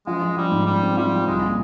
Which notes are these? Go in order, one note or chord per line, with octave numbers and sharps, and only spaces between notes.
F3 G#3
F3
F3 G3
G#2
G#2 G3
C4
F3 G3
F3
C2 G#3
A#2